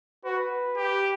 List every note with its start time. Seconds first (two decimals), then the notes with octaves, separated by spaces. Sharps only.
0.24 F#4 B4
0.77 G4